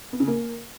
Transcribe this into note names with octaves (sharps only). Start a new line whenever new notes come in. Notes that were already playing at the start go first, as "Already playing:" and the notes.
B3
C#3
A#3